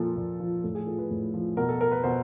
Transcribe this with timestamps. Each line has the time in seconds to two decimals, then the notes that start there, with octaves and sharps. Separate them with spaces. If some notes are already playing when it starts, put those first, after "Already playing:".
Already playing: A#2 F3 A4
0.17 A#2
0.40 F3
0.64 A2 A4
0.75 G#4
0.87 F3 A4
0.98 B4
1.11 A2
1.34 F3
1.57 B2 A#4
1.69 A4
1.81 A#4
1.92 B4
2.03 B2 C5